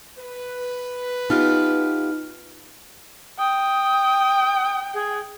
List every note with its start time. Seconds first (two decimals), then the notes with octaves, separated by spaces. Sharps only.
0.19 B4
1.30 B3 D#4 F4 G4 F6
3.39 G5 D#6
4.94 G#4